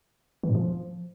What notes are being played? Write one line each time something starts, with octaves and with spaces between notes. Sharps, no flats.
E3
A2
F3